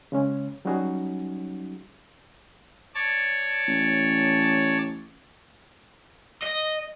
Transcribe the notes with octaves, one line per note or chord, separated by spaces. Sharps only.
C#3 G#3 C#4
F#3 G3 C#4 D#4 F#4 G#4
C#5 D5 A5
A1
D#5